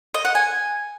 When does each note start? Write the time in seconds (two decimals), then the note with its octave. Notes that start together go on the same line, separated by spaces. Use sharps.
0.14 D#5
0.25 F#5
0.35 G#5